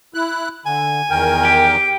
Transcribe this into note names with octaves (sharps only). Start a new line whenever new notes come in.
E4 F#6
D3 G#5
E2 D#3 A#4 G5
G4